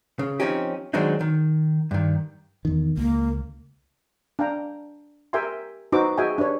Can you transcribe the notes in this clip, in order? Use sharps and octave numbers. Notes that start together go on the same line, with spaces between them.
C#3
F3 C4 C#4 D#4 G4
D#3 F#3 G#3 C4 D4 D#4
D#3
G2 D#3
E2 D#3
C#2 A#3
D4 F5 G5 A#5
G4 A#4 E5 G5 G#5 C6
D#4 F#4 B4 C5 D6 E6
F#4 G#4 D#5 E5 G5 G#5
D4 G4 B4 C#5